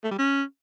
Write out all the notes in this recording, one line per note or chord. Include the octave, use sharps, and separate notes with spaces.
A3
G3
C#4